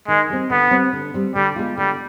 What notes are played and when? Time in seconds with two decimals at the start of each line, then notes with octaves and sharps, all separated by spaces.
0.08 D#3 G#3
0.30 G3 C4
0.50 D3 B3
0.71 G3 C4
0.93 D3
1.14 G3 C4
1.35 D3 G3
1.56 G#3 B3 F4
1.77 D3 G3